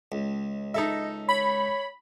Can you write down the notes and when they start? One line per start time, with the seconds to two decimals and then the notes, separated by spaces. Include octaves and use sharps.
0.12 C#2
0.74 D#4 A4 D#5 E5
1.29 C#5 B5